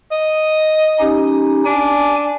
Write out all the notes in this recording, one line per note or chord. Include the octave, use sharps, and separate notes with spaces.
D#5
C#4 D#4 G4
D4 G#5